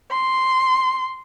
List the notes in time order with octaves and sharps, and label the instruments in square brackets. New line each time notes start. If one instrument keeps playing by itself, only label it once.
[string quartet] C6